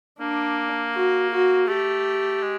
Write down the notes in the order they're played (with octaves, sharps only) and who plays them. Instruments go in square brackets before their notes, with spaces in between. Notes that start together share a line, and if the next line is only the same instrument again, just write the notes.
[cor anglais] A#3 [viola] D4
[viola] F#4
F#4
[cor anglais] A3 [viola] G4
[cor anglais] G#3